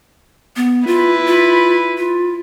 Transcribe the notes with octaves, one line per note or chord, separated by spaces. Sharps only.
B3
E4 F4 B4
F4
F4